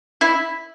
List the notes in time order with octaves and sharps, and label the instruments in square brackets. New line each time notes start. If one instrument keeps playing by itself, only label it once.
[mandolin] E4